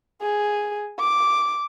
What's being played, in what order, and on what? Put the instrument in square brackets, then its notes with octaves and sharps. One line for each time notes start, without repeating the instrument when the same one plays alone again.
[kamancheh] G#4
D6